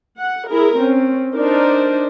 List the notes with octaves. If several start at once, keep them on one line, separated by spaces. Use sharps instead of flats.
F#5
E4 G#4 A#4
C4 C#4
D4 D#4 A#4 C5 D5